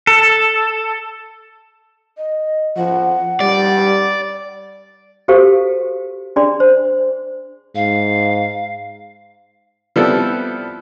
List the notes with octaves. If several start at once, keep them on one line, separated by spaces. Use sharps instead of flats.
A4
D#5
F3 F#5
G3 D5
F#4 G4 A4 A#4 C5 F5
D4 G#4 D5 C6
C5
G#2 F5
F3 G3 B3 C4 E4 A4